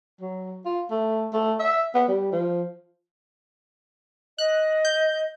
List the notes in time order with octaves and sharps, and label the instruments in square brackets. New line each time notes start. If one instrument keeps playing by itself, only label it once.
[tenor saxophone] F#3
F4
A3
A3
E5
B3
G3
F3
[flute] D#5 [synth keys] F#6
[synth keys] G6